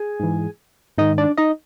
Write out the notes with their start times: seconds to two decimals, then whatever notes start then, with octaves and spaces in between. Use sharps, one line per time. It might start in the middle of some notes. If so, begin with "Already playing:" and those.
Already playing: G#4 G#5
0.20 G#2 E3
0.98 G#2 D#3 D#4 D#5
1.18 D4 D5
1.37 D#4 D#5